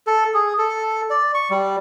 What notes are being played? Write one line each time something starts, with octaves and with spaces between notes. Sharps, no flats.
A4
G#4
A4
D5
C#6
G3